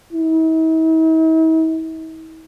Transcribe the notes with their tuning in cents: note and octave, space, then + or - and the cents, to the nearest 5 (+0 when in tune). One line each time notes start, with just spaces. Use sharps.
E4 -45